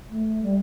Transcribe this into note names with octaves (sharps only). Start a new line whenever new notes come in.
A3
G3